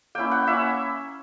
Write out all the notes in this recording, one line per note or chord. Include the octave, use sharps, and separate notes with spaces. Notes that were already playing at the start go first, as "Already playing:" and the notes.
A#3 C#4 E4 G5
F#5
A#3 C#4 E4 E5